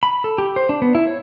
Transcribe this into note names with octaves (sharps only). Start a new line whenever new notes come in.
B5
A4
G4
C5
D4
B3
E4
C#5